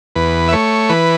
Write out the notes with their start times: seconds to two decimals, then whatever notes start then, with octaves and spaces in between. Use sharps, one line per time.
0.16 E2 B4
0.48 E5
0.52 A3 C#5
0.89 E3 B4